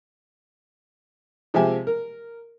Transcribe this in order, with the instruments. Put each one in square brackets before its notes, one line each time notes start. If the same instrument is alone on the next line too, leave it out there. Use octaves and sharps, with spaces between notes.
[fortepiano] C3 F3 G#3 G4 E5 G#5
A#4